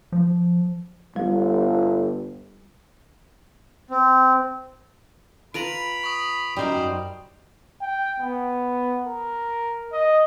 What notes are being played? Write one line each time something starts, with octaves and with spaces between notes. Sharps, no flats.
F3
G1 G3
C4
F4 B4 A#5 B5 D7 F7 F#7
C#6 D#6
F#2 G3 D#4 A#4 C5
G5
B3
A#4
D#5